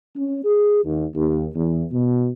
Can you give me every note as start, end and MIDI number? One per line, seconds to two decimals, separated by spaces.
0.16 0.44 61
0.45 0.82 68
0.85 1.05 39
1.15 1.45 39
1.55 1.84 40
1.92 2.28 47